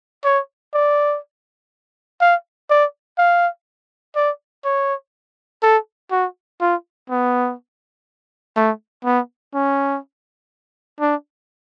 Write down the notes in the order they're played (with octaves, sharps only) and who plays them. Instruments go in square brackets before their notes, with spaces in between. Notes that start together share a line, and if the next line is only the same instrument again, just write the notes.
[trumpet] C#5
D5
F5
D5
F5
D5
C#5
A4
F#4
F4
B3
A3
B3
C#4
D4